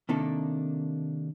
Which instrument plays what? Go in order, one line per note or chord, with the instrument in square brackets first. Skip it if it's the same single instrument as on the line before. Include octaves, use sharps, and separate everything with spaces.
[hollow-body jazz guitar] C3 D#3 A#3 D4 A4